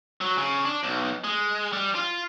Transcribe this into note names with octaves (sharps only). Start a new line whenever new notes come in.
F#3
C#3
D4
B1
G#3
G3
F4